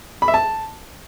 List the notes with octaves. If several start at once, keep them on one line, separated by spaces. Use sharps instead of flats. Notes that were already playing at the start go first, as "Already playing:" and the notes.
B5
E5
A5